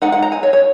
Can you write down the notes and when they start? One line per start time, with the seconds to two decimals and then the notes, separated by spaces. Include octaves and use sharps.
0.02 G#3 D#4 F#5
0.12 F#5
0.22 A#5
0.32 G#5
0.43 C#5
0.53 C#5